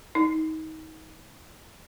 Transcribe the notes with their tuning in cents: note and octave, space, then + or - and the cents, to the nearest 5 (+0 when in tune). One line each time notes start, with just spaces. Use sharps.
D#4 +30